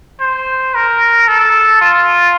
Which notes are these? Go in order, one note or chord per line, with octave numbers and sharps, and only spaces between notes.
C5
A#4
A4
F4